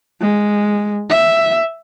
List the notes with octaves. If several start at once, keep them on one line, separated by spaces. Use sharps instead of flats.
G#3
E5